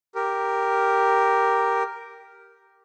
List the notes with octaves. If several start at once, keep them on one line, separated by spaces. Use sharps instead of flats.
G4 A#4